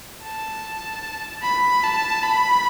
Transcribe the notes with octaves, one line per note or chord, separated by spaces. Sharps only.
A5
B5
A5
B5